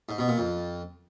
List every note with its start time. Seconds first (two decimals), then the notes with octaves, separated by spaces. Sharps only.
0.09 G#2
0.18 B2
0.28 A#2
0.38 F2